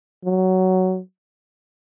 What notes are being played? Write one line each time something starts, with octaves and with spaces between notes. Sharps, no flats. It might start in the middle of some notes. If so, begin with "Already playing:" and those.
F#3